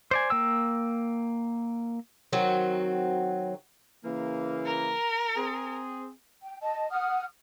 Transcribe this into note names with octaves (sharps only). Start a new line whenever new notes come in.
C5 D5 G#5
A#3 G5 E6
D#3 F#3 C4 F#4
C#3 E3 A#3
A#4
C4 G#4
G5
D#5 A5
F#5 D#6 F6